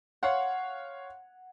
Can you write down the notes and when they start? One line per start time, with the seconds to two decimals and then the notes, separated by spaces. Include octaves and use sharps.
0.23 C#5 F5 F#5 C6